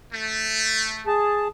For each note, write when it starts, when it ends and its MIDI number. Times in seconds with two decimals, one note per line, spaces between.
0.13 1.09 57
1.07 1.48 68
1.07 1.48 81